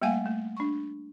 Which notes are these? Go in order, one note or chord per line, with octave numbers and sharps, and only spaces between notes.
G3 A3 A#3 F5 F#5 G#5
A3
D4 C#6